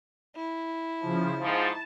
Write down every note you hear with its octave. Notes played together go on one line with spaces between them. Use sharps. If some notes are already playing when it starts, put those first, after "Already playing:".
E4
C#3 F3
G#2 F3 A5